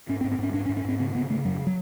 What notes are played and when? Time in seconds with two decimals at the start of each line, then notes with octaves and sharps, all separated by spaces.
0.09 G#2 C#4
0.21 C4
0.24 G#2
0.32 C4
0.39 G#2 C#4
0.53 G#2 D4
0.65 C#4
0.69 G#2
0.77 C#4
0.85 G#2 C4
0.99 C#3 C4
1.15 C#3 B3
1.29 C#3 A3
1.45 F#2 F#3
1.67 F#3